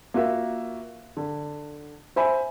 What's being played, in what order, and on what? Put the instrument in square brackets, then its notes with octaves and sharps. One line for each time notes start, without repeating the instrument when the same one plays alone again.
[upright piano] A#3 F4 F#4 E5
D3
C5 E5 G#5 B5